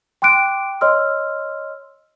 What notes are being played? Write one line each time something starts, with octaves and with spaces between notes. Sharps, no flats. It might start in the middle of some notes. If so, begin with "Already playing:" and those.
G5 C6 D6 F#6 D7
C#5 D#5 C6 E6 F6